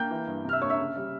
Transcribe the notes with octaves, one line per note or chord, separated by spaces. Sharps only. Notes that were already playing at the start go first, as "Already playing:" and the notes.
Already playing: A#3 G5 G6
E3
G2
C3 F6
E5 E6
A#3 C#5 C#6
E5 E6
C#3
G3